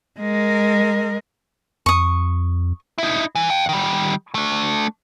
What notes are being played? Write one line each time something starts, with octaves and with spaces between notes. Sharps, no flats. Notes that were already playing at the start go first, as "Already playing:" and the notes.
G#3 A#4
F2 C#6 D#6
D#4 E4
E3
F5 G5
D#3 G3
A3 D4